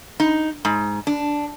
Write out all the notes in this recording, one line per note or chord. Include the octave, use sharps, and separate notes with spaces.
D#4
G#2
D4